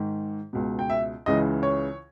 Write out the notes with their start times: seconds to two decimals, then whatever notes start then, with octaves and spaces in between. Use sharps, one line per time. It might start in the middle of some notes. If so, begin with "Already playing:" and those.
Already playing: G#2 D#3
0.53 C#2 B2
0.79 G5
0.90 E5
1.26 C#2 C#3 E3 D#5
1.63 C#5